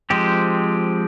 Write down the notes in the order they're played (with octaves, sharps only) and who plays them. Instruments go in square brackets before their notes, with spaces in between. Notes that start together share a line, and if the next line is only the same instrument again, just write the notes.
[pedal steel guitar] F3 G#3 C4 G4